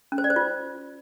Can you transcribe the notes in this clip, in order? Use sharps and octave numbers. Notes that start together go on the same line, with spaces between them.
C#4
C5
D5
C5
F4